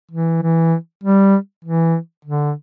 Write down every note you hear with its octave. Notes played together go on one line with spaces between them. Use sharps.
E3
E3
G3
E3
D3